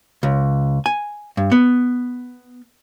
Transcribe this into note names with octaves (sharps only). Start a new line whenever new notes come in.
C#2
G#5
G2
B3